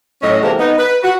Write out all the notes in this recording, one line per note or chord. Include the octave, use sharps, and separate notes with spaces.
A2 F#3 C#4 F#4 D#5
C3 E3 G#3 A#3 C4 A4
B3 D#4
B4
F#4